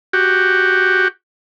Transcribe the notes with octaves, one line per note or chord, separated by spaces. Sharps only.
F#4 G4